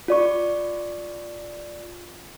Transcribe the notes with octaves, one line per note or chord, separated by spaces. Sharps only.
F4 D5 C#6